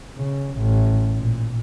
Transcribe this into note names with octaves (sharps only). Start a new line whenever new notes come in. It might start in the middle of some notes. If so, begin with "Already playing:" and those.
C#3
A1
A#2